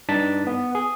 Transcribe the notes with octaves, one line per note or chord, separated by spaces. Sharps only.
G2 D4 D#4 A5 A6 B6
B3
G#4